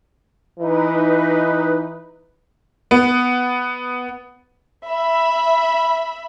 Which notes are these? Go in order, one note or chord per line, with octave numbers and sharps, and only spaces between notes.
E3 D#4 B4
B3
E5 B5